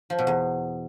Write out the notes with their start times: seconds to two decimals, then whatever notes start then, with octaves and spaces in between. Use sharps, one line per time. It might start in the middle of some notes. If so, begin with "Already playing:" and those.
0.10 F3
0.18 B2
0.27 E2